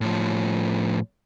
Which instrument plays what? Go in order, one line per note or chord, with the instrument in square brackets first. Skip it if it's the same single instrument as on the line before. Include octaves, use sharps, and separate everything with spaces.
[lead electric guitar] A2 F3